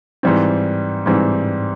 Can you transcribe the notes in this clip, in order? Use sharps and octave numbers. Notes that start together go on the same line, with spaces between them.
G#2 E3 G3 C4
G#2 E3 G3 C4